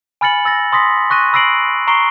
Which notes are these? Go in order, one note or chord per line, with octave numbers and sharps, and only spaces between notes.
G#5 B5 F6 A6 C#7 F#7
E6 A6 A#6
C6 D#6 A#6 B6
C#6 F#6 A#6 D#7
B5 E6 A#6 C7 D7 F#7
A#5 C#6 C7 D7 G7